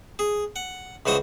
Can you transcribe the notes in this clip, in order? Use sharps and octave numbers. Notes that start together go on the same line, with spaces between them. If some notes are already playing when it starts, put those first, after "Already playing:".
G#4
F#5
C#2 E3 F#4 C5 D#6